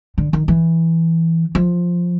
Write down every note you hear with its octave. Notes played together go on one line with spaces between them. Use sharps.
D3
D#3
E3
F3